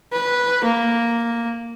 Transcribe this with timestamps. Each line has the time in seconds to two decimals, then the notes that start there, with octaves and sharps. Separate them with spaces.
0.12 B4
0.64 A#3